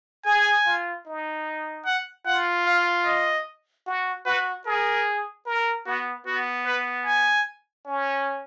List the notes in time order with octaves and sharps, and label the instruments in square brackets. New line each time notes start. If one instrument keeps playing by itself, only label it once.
[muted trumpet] G#4 [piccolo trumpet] G#5
[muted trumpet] F4
D#4
[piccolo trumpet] F#5
[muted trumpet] F4 [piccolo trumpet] F#5
[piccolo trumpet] F5
D#5
[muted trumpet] F#4
[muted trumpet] F#4 [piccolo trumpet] B4
[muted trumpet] G#4 [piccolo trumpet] A#4
[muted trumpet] A#4
[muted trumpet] B3 [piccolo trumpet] F#4
[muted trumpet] B3 [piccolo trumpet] F#4
[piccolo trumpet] B4
G#5
[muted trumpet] C#4